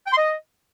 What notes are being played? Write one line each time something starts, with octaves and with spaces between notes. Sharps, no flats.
G5
C6
D#5